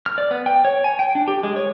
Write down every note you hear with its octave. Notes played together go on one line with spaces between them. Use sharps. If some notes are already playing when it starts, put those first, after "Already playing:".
F6
D5
B3
G5
C#5
G#5
G5
D4
G4
G#3
C#5